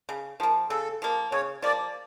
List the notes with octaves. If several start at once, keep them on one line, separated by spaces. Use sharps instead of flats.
C#3
F3 A#3
C#3 A4
F3 A#3
C#3 C#5
F3 A#3 D5